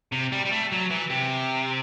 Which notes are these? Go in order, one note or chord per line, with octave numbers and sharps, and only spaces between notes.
C3
G3
G3
A3
F#3
E3
C3